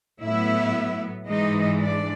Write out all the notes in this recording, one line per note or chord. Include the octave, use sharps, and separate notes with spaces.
A2 F#3 B3 E4 E5
G#2 E3 G#3 D#4 D#5
D4 D5